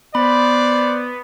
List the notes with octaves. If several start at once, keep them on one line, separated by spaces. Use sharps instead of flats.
B3 C5 D5 B5